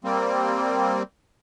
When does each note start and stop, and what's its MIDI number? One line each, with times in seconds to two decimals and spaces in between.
0.04 1.03 55
0.04 1.03 58
0.04 1.03 60